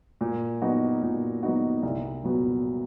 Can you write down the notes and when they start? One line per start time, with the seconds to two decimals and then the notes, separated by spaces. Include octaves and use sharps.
0.21 A#2
0.62 F#3 B3 D#4 F#4
1.03 A#2
1.43 F#3 B3 D#4 F#4
1.83 C2
2.23 A#2 F#3 B3